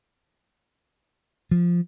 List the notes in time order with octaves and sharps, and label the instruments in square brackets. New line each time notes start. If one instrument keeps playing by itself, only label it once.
[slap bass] F3